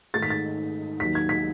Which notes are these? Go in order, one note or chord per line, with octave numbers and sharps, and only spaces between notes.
G#2 D#3 A3 A6
B6
A6
D#2 D#3 F#3 B6
G#6
B6